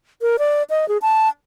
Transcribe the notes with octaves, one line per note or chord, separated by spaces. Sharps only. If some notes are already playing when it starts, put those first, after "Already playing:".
A#4
D5
D#5
G#4
A5